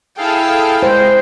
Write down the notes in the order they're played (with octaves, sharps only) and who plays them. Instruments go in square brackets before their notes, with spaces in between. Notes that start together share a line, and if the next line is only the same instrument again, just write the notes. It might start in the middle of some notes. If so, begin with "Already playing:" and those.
[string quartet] E4 G5 [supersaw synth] G#4 A4 F5
[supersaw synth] G#3 [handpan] C5